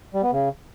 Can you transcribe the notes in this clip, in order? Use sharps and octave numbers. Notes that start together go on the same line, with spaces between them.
G3
B3
C#3